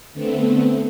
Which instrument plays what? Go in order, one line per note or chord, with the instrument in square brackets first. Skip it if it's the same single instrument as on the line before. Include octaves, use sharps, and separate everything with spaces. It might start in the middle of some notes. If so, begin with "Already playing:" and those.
[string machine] D3 A3 B3 C4